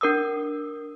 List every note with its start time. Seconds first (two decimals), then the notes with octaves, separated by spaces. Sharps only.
0.01 D4 A#4 D#6 E6